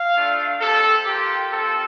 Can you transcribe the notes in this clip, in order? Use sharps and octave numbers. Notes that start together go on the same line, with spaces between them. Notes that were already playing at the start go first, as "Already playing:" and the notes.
Already playing: F5
A3 D4 F4
C4 G4 A4
A#3 F4 G4
C4 F4 A4